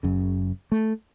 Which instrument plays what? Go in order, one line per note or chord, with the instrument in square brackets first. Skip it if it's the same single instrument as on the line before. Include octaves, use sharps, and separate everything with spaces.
[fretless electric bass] F#1 F#2 C#3
A3